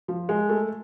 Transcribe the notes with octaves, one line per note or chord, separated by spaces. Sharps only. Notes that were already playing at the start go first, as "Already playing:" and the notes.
F3
G#3
A3